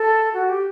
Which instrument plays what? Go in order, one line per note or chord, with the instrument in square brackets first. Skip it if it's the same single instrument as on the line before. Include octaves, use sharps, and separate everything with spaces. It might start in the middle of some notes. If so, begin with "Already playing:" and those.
Already playing: [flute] A4
F#4
G4